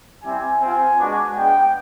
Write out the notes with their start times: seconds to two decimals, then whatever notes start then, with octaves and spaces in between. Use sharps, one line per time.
0.24 G3 C4 E4 G#5
0.61 C4 F4 G#5
0.99 G#3 B3 D4 F#4
1.36 G#3 B3 D4 G5